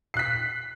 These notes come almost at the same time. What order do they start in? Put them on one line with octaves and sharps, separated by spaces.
C7 F#6 B6